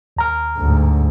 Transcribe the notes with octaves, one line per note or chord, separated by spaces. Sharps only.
D#2 A#5 F6
D2 G#2